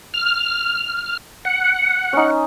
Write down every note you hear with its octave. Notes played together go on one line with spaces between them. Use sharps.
F6
F#5
C#4 D#4